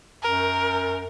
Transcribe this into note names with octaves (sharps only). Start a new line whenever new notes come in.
F#2 A#4